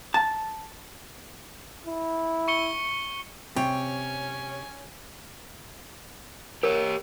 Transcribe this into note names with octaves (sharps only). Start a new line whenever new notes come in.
A5
E4
C#6 C#7 G7
C3 C#4 C#5 G5
G4 A#4 C#5